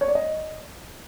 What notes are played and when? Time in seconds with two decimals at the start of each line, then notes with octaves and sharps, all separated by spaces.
0.01 C#5
0.08 D5
0.15 D#5